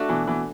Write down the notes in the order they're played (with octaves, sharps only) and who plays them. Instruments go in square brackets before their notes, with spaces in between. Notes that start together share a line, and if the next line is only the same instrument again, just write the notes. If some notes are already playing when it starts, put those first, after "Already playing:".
Already playing: [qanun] A3 D4 F#4
[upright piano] B2 E3
B2 E3